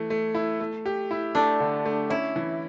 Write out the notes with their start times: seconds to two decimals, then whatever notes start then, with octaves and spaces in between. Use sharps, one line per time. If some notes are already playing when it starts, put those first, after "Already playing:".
Already playing: E3 A3
0.10 A3
0.35 E4
0.60 A3
0.86 G4
1.11 E4
1.35 A3 D4
1.60 D3
1.85 A3
2.10 C#4 E4
2.36 E3